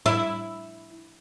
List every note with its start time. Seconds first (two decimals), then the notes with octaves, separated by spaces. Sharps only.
0.06 E4